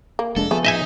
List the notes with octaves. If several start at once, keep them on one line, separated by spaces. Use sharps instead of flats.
A#3
F1 G#3 D4 A4
F3 A3 B3 G#4
D#4 D#5 E5 G#5